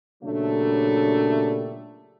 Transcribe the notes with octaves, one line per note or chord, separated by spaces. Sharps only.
A#2 C#3 F#3 G3 A3 D4